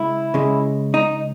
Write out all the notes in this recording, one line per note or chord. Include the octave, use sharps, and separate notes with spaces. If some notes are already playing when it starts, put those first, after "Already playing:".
Already playing: C#3 G#3 E4
C#3 G#3
D#4